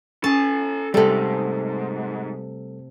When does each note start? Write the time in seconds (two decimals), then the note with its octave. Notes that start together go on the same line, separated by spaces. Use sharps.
0.24 C#4 A4 G#5 A5
0.94 D2 G#2 C3 G3 A3 A4